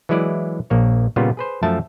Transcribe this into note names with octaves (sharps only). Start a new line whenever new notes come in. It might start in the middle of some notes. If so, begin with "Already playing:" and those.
E3 F#3 G#3 E4 D5
A#1 A#3 C#5
A#2 C#3 G3 B3 F4
G#4 B4 C5
F#2 F3 A3 E5 A5